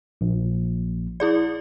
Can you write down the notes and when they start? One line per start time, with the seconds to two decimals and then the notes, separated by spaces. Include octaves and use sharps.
0.21 A#1
1.20 E4 G#4 D5